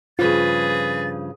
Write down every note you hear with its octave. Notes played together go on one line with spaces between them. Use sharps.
G2 C#3 F3 F4 G#4 B4 A6